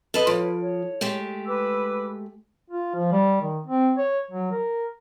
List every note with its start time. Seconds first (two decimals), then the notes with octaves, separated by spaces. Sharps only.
0.14 A4 B4 D#5
0.27 F3 B4 C#5
0.60 C#5
1.01 G#3 A3 G4
1.46 B4 D6 E6
2.70 F4
2.95 F3
3.12 G3
3.42 D#3
3.67 C4
3.98 C#5
4.31 F#3
4.52 A#4